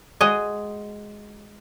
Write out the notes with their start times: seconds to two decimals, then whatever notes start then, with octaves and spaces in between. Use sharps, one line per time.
0.21 G#3 F#4 G#4 D#5